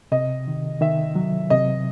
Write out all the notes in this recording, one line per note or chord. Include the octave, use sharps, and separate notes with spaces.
C3 D#5
D#3
D#3 E5
F#3
C3 D#5